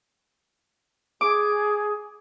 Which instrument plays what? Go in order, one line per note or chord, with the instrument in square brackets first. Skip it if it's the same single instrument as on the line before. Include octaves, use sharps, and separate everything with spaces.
[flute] G#4 [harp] D6